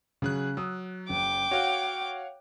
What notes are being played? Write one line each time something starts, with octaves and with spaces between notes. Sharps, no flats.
C#3 F#3 G#4 F#6
F#3 D#6 E6
F#1 G5 D6
F#4 C#5 F5 F#5